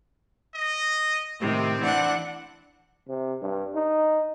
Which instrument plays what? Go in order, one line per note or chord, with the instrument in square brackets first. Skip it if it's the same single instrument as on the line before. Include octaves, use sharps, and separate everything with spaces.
[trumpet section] D#5
[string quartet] A2 C3 D#3 [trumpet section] C4
[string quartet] E3 D4 F#5
[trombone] C3
G2
D#4